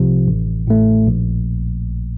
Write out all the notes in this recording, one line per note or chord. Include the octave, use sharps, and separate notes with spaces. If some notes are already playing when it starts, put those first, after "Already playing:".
Already playing: C2 C3 F3
A1
A2 A3
A#1